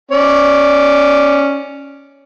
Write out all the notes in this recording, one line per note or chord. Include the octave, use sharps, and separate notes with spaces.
C#4 D5